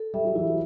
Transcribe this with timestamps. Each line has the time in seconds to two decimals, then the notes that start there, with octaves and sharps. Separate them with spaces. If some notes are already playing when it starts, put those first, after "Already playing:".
Already playing: A4
0.14 G3 E5
0.25 F#3
0.35 E3 E4
0.46 F#3